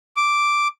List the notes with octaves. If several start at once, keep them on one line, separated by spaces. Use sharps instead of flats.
D6